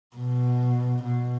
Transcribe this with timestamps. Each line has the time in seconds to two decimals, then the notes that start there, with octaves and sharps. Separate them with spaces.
0.16 B2
1.03 B2